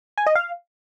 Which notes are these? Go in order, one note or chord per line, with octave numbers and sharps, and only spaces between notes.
G#5
D#5
F5